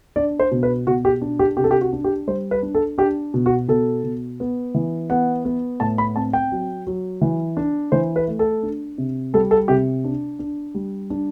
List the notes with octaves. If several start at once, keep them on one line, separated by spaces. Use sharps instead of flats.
D4 D5
C5
B2
B4
B2 F#4
G4
D4
G4
C3 G4
A4
G4
F#4
D4
G4
G3 C5
B4
D4
A4
D4 G4
B2
F#4
B2 A4
B2
B3
E3
B3 F#5
B3
A2 A5
B5
C4 A5
G5
F#3
F#3
E3
D4
E3 C5
B4
A3
A4
D4
C3
G3 A4
A4
C3 G4
D4
D4
G3
D4